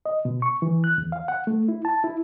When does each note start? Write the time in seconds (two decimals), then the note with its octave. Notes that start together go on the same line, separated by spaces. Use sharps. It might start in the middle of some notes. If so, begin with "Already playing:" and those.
0.06 D#5
0.25 B2
0.42 C#6
0.62 E3
0.84 F#6
0.98 E2
1.12 F5
1.28 F#5
1.47 A3
1.68 E4
1.85 A5
2.04 E4